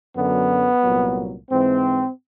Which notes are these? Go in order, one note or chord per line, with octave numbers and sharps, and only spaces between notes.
F#2 D3 F#3 B3
C2 A#2 F#3
G#2 E3 C4